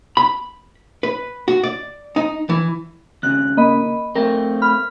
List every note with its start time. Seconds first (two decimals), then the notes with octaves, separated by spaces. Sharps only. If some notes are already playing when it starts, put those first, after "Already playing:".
0.17 B5
1.03 B4
1.48 F#4
1.63 D5
2.16 D#4
2.49 E3
3.23 D#2 C#3 F#6
3.57 A#3 D#5 B5
4.16 A3 C4 A#4
4.62 B5 F6